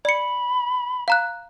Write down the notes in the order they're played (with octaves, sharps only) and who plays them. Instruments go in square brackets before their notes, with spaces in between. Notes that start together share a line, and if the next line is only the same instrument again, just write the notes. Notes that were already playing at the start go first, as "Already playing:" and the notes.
[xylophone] D5 C#7 [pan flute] B5
[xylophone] F5 A#5 F#6